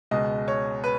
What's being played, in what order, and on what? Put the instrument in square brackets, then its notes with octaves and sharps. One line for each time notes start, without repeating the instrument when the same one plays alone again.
[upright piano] C#2 B2 G#3 D#5
C#5
B4